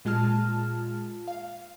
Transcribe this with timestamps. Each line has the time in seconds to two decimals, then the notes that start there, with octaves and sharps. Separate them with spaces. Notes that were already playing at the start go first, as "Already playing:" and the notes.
0.05 A#2 G#3 F4 A5 F6
1.28 F5